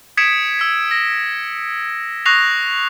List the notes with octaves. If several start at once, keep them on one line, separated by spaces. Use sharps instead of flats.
D#6 G#6 B6 C#7 D7 E7
E6 B6
A#6
C#6 D#6 F#6 A#6 C7 F7